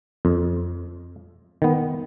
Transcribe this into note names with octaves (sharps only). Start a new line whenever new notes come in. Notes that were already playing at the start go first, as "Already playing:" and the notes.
F2
D#3 B3